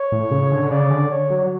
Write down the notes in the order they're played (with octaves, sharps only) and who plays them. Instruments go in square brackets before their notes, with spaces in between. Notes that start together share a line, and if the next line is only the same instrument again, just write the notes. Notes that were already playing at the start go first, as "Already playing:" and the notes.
Already playing: [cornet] C#5
[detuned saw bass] A2
C#3
D3
[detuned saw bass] C#3 [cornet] D5
[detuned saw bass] D3
[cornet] C#5
[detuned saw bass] F#3